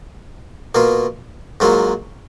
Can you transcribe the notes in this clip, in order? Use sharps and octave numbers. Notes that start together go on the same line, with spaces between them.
B2 A#3 F4
G#2 F#3 A#3 F4